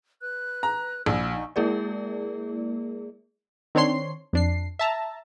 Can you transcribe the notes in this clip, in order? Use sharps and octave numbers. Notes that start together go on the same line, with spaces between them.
B4 F#6
A#5
A#1 E4 E6
D#4 C#6
G#3 A#3 E4 G#4 A#4 D5
D#3 C4 D4 C#5 C6 C7
F2 D4 C7
E5 A5 A#5